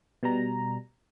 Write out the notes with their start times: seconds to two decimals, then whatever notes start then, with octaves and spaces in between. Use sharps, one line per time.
0.23 B2 G3 A#5